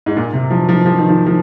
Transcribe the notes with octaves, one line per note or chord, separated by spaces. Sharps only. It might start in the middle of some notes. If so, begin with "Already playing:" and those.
G#2
A#2
C3
F3
F3
F3
D#3
F3
F3